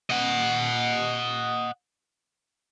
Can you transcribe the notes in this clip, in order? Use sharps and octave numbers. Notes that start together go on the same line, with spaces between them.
D#5 F#5